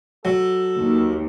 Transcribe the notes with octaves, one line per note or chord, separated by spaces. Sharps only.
F#3 A4
D#2